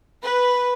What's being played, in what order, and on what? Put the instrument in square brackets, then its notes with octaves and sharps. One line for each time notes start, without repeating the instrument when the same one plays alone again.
[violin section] B4